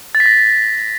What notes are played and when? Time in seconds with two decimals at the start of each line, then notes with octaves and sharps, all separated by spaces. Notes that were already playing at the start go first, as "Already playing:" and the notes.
0.15 A6
0.20 B6
0.26 A#6